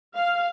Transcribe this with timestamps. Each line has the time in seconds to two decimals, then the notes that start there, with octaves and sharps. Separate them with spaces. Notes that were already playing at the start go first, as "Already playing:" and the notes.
0.15 F5